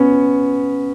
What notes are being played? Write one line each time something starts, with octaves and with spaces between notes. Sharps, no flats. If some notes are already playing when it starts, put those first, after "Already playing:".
Already playing: B3 C#4